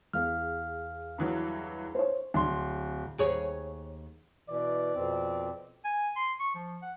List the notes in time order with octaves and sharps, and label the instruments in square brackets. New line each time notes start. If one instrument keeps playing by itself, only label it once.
[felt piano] E2 [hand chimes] G#4 F5 F6
[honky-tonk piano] G2 E3 F#3
[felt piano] C5 C#5
[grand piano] D1 C6
[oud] D#2 G#4 C#5
[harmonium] B2 E3 [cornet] D5
[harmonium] F2 B2 C4
[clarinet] G#5
C6
C#6
F3
F#5